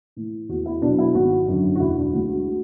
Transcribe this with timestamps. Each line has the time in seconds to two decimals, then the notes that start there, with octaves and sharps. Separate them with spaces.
0.16 A2 E3
0.49 E2 F#4
0.66 E4
0.82 B2 D4
0.85 F#3
0.99 E4
1.14 G#1 F#4
1.48 F#2 D3 F#3
1.75 F#4
1.80 E1 E4
1.97 D4
2.13 D2 D3 G#3 F#4
2.29 F#4